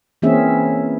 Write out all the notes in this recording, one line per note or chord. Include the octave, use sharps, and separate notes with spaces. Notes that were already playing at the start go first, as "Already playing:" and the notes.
E3 A#3 C4 C#4 G#4 E5